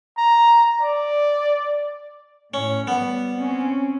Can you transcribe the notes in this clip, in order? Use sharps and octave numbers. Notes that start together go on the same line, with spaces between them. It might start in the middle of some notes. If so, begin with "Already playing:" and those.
A#5
D5
A2 C#4
G3 B3
C4 C#4